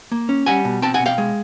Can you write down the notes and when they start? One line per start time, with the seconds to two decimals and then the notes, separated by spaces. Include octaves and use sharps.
0.12 A#3
0.29 C#4
0.46 G3 F#5 G#5
0.65 B2
0.82 C4 G5 A5
0.94 F#5 G#5
1.00 B2
1.06 F5 G5
1.18 G#3